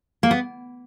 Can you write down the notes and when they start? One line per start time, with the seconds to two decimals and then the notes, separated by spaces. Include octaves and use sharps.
0.23 A#3
0.31 B3